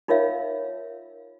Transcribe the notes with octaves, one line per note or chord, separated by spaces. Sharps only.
D#4 F4 A#4 C#5 E5 F5